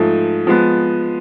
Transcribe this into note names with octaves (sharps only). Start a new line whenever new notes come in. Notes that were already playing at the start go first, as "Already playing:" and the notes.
Already playing: G#2 F3 A3
F3 G#3 B3